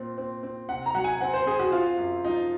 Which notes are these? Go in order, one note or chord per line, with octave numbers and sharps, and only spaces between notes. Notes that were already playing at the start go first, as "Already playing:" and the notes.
Already playing: A#2 C4
C4
C4
C3 F#5
A#5
F#3 F#5
G#5
C4 F#5
C5
C4 G#4
F#4
C4 F4
F#2
F3 D#4